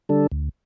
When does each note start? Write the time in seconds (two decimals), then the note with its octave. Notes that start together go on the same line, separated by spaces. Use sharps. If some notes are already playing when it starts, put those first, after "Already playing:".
0.09 D3 G3 D4 A4
0.32 D2